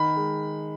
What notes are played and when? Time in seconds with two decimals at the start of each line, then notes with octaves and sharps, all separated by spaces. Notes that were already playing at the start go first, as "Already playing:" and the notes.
Already playing: D#3 B5
0.16 G#3